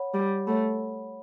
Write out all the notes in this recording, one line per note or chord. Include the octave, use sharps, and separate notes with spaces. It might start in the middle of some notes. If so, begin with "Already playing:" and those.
Already playing: C#5 F#5 B5
G3
A3 C#5 F#5 B5